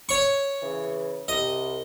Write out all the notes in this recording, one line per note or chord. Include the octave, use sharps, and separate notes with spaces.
C#5 C#6
C#3 E3
C2 D#5